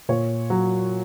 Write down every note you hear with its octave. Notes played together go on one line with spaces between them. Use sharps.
A#2 C#5
F#3